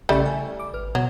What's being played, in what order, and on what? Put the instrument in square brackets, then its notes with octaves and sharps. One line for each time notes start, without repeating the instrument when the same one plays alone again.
[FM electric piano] A#1 C#3 C#6 [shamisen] G3 A3 E4
[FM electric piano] G#5
D6
G#1 B4 F6
[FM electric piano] B2 [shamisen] F#3